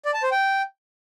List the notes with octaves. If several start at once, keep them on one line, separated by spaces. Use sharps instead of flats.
D5
A5
C5
G5